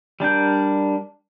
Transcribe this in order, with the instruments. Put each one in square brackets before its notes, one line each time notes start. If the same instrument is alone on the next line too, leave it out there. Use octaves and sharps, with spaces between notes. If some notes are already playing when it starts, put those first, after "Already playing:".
[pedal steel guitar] G3 D4 A#4 G6